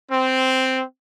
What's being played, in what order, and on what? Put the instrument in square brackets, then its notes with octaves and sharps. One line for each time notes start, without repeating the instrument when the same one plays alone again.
[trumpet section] C4